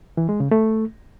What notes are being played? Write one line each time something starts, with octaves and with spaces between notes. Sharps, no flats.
E3
G#3
C#3
A3